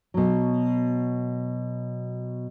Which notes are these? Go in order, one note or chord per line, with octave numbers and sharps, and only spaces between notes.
B2 F#3